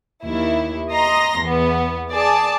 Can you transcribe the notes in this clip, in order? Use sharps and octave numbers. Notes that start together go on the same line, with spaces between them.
D#2 E4
D#5 A#5 C6 A#6
E2 B3
G#4 D5 A5